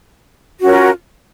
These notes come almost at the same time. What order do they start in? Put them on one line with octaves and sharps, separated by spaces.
F#4 C#4 A#4 F4